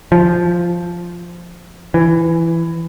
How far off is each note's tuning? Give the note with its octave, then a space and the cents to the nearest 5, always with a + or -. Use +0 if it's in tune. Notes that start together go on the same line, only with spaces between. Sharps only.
F3 -5
E3 +15